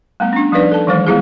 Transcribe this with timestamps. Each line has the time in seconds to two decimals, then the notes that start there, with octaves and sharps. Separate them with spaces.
0.20 G3 A3 B3
0.33 C#4 D4
0.52 F3 G3 D4 D#4 B4 D5
0.71 A4 A5
0.87 D#3 E3 F#3 G#3 C5
1.07 G3 G#3 B3 E4 F4 G#4